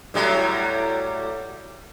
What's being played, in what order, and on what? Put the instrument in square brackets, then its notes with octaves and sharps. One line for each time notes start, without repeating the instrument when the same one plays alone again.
[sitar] A2 F#3 G3